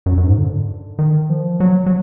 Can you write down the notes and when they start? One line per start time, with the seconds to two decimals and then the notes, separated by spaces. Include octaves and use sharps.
0.06 F#2
0.18 F#2
0.27 G#2
0.38 D3
0.99 D#3
1.30 F3
1.60 F#3
1.86 F#3